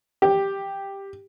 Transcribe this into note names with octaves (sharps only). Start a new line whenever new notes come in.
G4